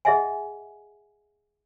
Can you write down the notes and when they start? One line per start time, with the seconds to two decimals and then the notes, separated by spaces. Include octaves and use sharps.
0.05 G#4 D#5 E5 F#5 G#5